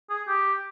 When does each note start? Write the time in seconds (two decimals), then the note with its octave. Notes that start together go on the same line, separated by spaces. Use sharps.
0.10 G#4
0.27 G4